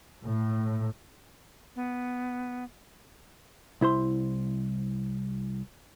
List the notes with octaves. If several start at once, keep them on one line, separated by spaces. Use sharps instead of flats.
A2
B3
C2 E4 C5 C6